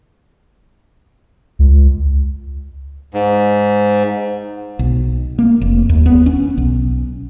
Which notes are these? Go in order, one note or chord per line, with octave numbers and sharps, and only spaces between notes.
C#2
G#2
B1
A#3
F1
D#2
B3
C#4
B1